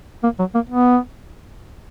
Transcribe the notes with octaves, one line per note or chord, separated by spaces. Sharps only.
A#3
F#3
A#3
B3